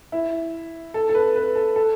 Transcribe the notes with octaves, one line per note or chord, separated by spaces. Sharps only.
E4
A4
A4
B4
B4
A4
A4